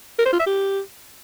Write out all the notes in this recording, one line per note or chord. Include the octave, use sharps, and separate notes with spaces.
A#4
C5
F4
E5
G4